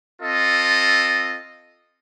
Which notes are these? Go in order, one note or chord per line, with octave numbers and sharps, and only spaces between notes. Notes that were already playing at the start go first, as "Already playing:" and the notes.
C4 F4 A4 D#5